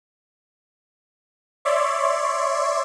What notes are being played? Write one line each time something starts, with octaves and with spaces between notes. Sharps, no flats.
C#5 D5 E5 C6